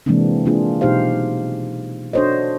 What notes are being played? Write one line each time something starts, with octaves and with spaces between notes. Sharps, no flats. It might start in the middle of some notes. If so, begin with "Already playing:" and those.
C3 E3 G#3 A#3 C4 D4
A#3 D4 F4 G#4
B2 F#3 D#4 G4 C5 F5
D4 F#4 A4 C5 C#5 D#5